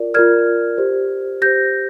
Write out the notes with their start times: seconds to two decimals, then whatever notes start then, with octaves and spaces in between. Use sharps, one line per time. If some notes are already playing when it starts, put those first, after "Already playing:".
Already playing: F4 A#4 D5
0.14 F4 A#4 D5 F6 G#6
0.78 G4 C5
1.42 G4 C5 G6 A#6